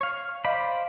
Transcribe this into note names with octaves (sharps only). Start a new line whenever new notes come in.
C#5 F5
C5 D5 D#5 F5 B5